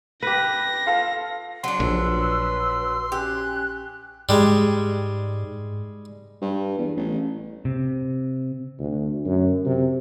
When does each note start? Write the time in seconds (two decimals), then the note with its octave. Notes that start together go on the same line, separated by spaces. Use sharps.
0.22 G4 B4 A#6
0.87 F4 A4 F5
1.64 F#3 D4 C6
1.80 A#1 B4 E6
3.12 C#4 G4 F#6
4.29 G#2 G3 G#3
6.41 G2
6.78 E2
6.96 A1
7.65 C3
8.79 D2
9.25 F#2
9.66 C3